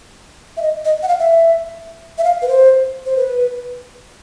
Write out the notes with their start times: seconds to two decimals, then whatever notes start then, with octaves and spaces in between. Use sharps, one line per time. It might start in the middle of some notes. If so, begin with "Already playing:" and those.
0.57 E5
0.62 D#5
0.85 D#5
1.03 F#5
1.08 F5
1.20 E5
2.18 E5
2.24 F5
2.42 B4
2.48 C5
3.06 C5
3.17 B4